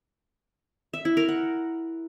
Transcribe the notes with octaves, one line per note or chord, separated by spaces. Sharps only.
E5
E4
A#4
F#5